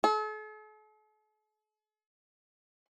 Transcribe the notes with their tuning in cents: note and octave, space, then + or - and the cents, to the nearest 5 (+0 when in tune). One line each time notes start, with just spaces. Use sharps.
A4 -45